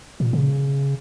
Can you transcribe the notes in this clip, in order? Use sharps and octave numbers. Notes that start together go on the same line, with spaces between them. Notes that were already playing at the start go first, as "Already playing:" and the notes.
A#2
C#3